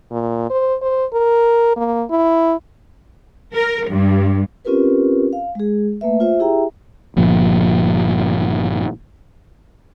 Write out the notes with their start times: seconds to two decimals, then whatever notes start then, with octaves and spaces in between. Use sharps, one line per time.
0.11 A#2
0.50 C5
0.82 C5
1.13 A#4
1.76 A#3
2.10 E4
3.54 A#4
3.89 G2
4.65 C4 C#4 F4 G4 A#4 B4
5.33 F5
5.55 G#3 G#4
6.01 A3 A#3 B4 E5
6.20 F4 C5 E5
6.40 E4 G4 G#4 E5 G5 A#5
7.16 G1 A#2 F3